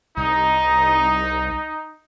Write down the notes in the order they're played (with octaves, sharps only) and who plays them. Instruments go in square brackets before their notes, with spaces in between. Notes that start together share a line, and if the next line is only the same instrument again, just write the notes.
[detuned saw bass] C2 [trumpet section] D#4